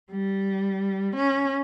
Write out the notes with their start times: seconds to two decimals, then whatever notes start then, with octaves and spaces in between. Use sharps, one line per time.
0.11 G3
1.16 C#4